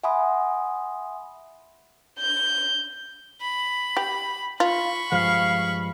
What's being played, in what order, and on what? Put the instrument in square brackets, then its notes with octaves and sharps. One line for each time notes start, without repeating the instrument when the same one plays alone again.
[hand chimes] E5 F#5 G#5 B5 C6 D#6
[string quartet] G6
[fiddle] B5
[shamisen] G4
[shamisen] F4 [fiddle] B5 C#6
[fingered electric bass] G2 F3 G#3 [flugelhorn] F5